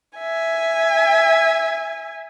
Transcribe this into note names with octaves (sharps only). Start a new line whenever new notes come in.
E5 G#5